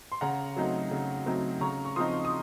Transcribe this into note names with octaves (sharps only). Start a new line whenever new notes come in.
C6
C#3 F#5 A#5
F#3 A3 C4 D#4
C#3
F#3 A3 C4 D#4
C#3 A#5 C#6
C#6
F3 C4 D#4 C6 D#6
D#6